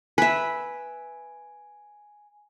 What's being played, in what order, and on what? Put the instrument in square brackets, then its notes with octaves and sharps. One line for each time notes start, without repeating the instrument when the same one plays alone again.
[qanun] B4 E5 [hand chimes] G#5